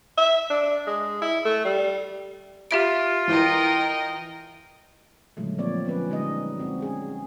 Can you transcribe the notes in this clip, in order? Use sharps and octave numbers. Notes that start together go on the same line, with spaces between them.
E5
D4
G#3
E4
A3
G3
F4 G4 E5 D7
E3 A#4 D#5 G5
A#2 D3 D#3 F#3 G#3 A3
F3 A#3 C4 C#5 D5
F3 B3 C#4 B4
D3 G3 G#3 D#4 D#5
G#3 C4 F#4
C#4 G#4